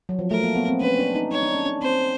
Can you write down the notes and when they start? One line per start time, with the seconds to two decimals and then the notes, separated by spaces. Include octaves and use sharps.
0.09 F#3
0.19 F3
0.31 A3 A#4
0.44 A#3
0.56 B3
0.68 C4
0.81 C#4 B4
0.99 D4
1.15 D#4
1.31 D#4 C#5
1.43 D4
1.55 C#4
1.66 D4
1.82 C4 C5